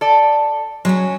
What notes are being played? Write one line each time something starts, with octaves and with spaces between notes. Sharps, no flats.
A4 D5
F#3 G#3 C#4